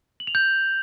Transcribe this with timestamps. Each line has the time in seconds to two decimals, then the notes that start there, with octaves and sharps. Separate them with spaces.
0.20 F#7
0.27 F7
0.35 G6